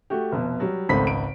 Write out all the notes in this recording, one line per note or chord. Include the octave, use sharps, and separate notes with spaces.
A3 F#4 G4
F1 B2
F#3 G3
G#1 C#2 A3 C4 B5 B6
D7